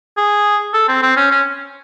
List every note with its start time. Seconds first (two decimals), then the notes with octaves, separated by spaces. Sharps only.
0.17 G#4
0.74 A4
0.88 C4
1.02 C4
1.17 C#4
1.31 C#4